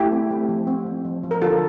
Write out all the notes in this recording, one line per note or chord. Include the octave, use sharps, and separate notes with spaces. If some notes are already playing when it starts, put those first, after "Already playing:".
Already playing: A3 E4 G4
C4
A3
F3
C4
F3
F3
F3
A#4
D3 F4 A4